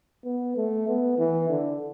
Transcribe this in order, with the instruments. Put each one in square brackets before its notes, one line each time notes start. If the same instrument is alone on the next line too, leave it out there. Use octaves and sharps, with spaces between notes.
[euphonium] B3
A3
B3
E3
D3